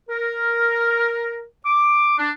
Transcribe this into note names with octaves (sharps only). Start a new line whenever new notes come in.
A#4
D6
D4